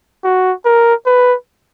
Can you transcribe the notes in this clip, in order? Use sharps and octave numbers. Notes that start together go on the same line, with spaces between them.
F#4
A#4
B4